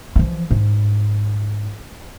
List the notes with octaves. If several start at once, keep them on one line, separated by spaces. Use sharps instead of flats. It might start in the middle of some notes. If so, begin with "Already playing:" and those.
E3 F3
G#2